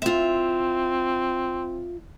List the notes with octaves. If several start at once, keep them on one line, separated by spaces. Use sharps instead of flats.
C4 F4 E5